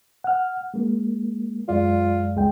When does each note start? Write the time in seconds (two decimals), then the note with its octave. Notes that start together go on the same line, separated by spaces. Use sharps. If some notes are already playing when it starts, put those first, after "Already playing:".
0.24 F#5 F6
0.74 G#3 A#3
1.68 F#2 G#3 F4 D5
2.36 C#2 G#3 G5